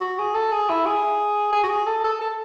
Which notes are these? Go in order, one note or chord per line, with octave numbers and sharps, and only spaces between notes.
F#4
G#4
A4
G#4
E4
G#4
G#4
F#4
G#4
A4
A4
A4